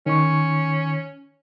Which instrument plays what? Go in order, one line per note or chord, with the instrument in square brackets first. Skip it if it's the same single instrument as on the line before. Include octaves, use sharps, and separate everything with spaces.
[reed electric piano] D#3 C#6 [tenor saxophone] C#4